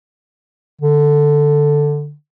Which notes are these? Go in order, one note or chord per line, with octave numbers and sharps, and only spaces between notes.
D3